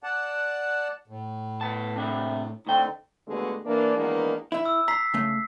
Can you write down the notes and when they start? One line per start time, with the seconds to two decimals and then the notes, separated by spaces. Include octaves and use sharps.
0.03 D5 F#5 A5
1.07 A2
1.61 B3 A5
1.96 C3 D4 E4
2.67 A2 D3 C4 D#4 G5
3.27 D#2 B2 D3 G#3 A3
3.65 E3 A#3 D4
3.96 D#3 E3 G#3 A#3 B3 D4
4.52 E4 E5
4.65 E6
4.88 A#5 B6 C7
5.14 C#3 A3